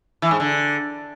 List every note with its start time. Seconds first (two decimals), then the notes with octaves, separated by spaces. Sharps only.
0.22 E3
0.31 G#2
0.40 D3